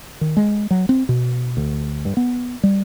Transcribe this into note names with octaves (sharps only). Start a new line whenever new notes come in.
D#3
G#3
F#3
C4
B2
D2
G2
B3
G3